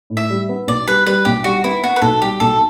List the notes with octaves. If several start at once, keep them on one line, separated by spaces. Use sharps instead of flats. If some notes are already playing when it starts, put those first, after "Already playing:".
A2
E5
G3
B3
B1 D5
G3 B4
G3 B4
B1 G4
G3 F#4
B3 E4
B3 F#4
B4
B1 A4
G3 G4
B1 A4